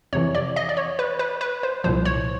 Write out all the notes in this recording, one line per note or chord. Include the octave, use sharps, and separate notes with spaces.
F2 C3 E3 C#5
D5
D#5
D5
C#5
B4
B4
B4
C5
C2 A#2 F3 C5
C#5